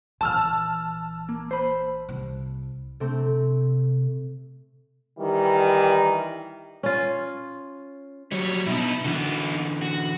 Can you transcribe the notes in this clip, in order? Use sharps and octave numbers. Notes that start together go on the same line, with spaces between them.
A#1 E3 A5 E6 F6
A#3
C5 B5
C2
C3 A3 C4
D#3 E3 G3
C#4 F4
F#3 G3 C#5
B2 D#4 E4
D3 E3 D#4 F#4
F#4